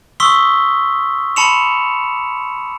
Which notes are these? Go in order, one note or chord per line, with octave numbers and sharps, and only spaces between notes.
C6 C#6 D#6 E6 B6 G7
A5 B5 C6 C#7 E7 F7